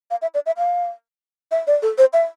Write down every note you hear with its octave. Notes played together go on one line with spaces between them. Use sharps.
F5
E5
D5
E5
F5
E5
D5
A4
C5
E5